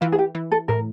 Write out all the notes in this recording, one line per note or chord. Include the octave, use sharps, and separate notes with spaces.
E3 F4
G#4
G4
E3
A4
A2 A#4